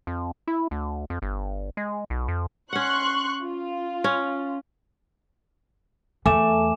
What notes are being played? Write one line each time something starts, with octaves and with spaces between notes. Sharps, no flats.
F2
E4
D2
F2
G1
G#3
B1
F2
C#4 F#5 C6 C#6 F#6
F4
C#4
E2 A3 G#5 D6 E7